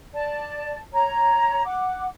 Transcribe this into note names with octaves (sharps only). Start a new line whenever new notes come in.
D5 A5
C#5 A#5
F#5 D6